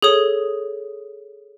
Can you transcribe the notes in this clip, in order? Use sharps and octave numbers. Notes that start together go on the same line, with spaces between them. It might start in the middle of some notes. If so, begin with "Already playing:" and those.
G#4 A4 C#5 D#6